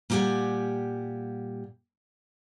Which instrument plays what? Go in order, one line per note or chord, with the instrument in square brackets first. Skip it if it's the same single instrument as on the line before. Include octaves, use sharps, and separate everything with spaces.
[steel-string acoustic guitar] A#2 G3 G4 F#5 G#5